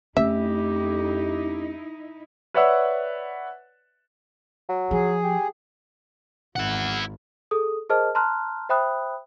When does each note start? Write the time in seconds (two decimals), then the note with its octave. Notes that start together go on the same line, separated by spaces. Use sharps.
0.17 F2 A3 C#4 D#4 E4 G4 E5
2.54 B4 C#5 D5 E5 F#5 E6
4.69 F#3
4.91 F3 G#4
5.23 G4
6.56 G#1 E4 F#5
7.51 G#4 A4 D#6
7.89 G#4 A#4 C5 D#5 A5 F6
8.15 A5 A#5 C6 F6 F#6
8.69 C5 E5 G5 B5 D#6 F#6